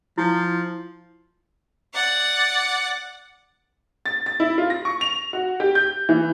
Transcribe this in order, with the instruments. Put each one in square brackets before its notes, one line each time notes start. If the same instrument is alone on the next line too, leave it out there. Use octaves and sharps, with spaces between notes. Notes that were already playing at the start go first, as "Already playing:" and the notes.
[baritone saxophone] F3 [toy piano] E4
[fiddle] D5 F#5
[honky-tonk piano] A6
A6
E4
F4
A#6
C#6
F7
F#4
G4
G6
E3